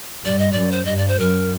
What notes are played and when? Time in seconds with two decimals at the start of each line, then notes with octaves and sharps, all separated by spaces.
0.25 G2 D5
0.39 D#5
0.52 F#2 D5
0.72 C5
0.85 G2 D#5
0.97 D5
1.08 C5
1.19 F#2 A#4